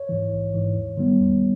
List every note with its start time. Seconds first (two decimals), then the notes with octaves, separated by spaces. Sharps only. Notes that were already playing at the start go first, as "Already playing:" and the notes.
Already playing: C#5
0.09 G#2 E3
0.32 A#1
0.54 G#2 E3
0.75 D#2
0.97 D#3 G3 B3
1.20 D#2